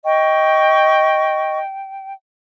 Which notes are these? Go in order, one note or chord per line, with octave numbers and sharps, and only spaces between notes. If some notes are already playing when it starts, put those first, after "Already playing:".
D#5 G5 C#6